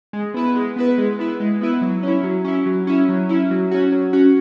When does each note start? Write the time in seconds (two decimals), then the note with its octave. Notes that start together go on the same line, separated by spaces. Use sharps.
0.13 G#3
0.34 B3 E4 B4
0.55 G#3
0.76 B3 E4 B4
0.98 G#3
1.19 B3 E4 B4
1.40 G#3
1.61 B3 E4 B4
1.81 F#3
2.03 C#4 E4
2.23 F#3
2.44 C#4 E4
2.66 F#3
2.87 C#4 E4
3.09 F#3
3.29 C#4 E4
3.51 F#3
3.71 C#4 F#4
3.92 F#3
4.13 C#4 F#4